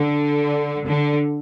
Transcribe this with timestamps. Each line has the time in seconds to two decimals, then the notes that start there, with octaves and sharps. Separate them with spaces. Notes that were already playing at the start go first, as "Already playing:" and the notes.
Already playing: D3
0.86 D3